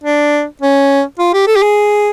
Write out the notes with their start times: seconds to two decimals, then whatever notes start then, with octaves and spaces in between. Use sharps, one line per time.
0.04 D4
0.62 C#4
1.19 F4
1.34 G4
1.47 A4
1.56 G4
1.63 G#4